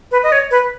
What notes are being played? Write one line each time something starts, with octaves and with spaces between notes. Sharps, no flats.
B4
D#5
C#5
B4